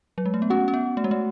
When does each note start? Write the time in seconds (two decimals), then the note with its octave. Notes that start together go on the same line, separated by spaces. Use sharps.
0.18 F#3
0.26 G#3
0.34 A3
0.42 B3
0.50 C#4 F#4
0.68 C#4
0.74 B3
0.97 A3
1.04 G#3
1.11 A3